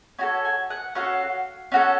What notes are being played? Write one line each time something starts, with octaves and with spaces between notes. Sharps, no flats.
C#4 F#4 A4 G#5
G#5
F#5
C#4 F#4 A4 F5
C#4 F#4 A4